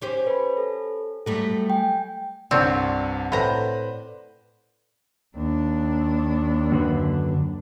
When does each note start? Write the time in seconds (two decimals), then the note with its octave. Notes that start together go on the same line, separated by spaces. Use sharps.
0.02 C#4 G4 C5
0.27 B4 B5
0.57 A4
1.26 F#3 G3 A3 A4
1.70 G5 G#5
2.51 C2 G2 C4 C#5 D5 F#5
3.32 A2 B4 C5 A#5 B5
5.35 D#2 D4
6.72 F#2 D3 B4